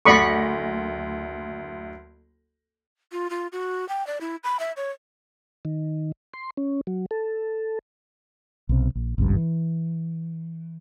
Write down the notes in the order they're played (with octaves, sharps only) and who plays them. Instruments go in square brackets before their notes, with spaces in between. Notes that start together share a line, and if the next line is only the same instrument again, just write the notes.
[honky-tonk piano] F#1 D2 A#6 [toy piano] A4 F#5 [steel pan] D5 B5 C#6
[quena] F4
F4
F#4
G5
D5
E4
B5
E5
C#5
[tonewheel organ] D#3
C6
C#4
F#3
A4
[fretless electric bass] B1 C3
A#1
G#1 C#2 G2
E3